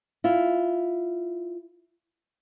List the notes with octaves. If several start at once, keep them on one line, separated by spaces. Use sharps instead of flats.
E4 F4